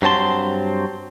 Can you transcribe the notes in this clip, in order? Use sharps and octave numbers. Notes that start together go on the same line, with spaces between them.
G2 F#3 C4 A5 C6